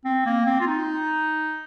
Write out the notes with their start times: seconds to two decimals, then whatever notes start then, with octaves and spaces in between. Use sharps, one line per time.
0.05 C4
0.26 A#3
0.46 C4
0.61 F4
0.67 D#4